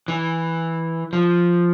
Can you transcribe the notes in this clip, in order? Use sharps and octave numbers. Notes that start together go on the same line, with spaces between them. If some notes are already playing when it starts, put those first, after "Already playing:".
E3
F3